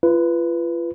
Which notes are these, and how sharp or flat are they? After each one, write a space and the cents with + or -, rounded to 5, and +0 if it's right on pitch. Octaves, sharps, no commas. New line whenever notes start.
F4 -35 B4 +0